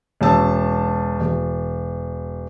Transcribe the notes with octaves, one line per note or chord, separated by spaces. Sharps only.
E1 C#4 A5 E6
E1